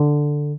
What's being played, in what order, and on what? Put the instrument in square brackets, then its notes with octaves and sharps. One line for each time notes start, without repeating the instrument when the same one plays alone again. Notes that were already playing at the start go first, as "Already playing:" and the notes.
Already playing: [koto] D3